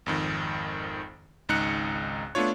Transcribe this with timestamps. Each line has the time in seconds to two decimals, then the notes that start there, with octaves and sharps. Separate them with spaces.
0.06 G#1 F2 D#3
1.49 G#1 C#2 D#4 A#5 F#6 C#7
2.35 A3 B3 D4 F4 C#5